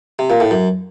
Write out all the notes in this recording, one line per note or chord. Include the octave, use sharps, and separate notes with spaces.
C3
A#2
A2
F#2